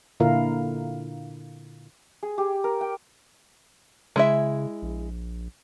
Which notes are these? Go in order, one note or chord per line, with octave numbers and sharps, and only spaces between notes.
A#2 D3 E4 F4 A#4 F5
G#4
G4
A#4
G5
C#3 G#3 E4 E5
A#1